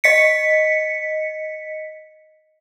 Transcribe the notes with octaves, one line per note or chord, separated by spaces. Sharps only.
D#5 B6 C#7